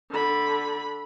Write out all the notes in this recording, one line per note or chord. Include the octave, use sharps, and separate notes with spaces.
D3 B5